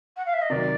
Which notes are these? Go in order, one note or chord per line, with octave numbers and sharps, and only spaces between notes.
F#5
F5
E5
D#5
C3 D#3 F#3 D5